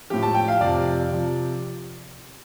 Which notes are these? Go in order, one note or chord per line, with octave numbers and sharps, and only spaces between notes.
A2 F3 G4
A5
G5
F5
F2 C3 F3 D5
C3 F3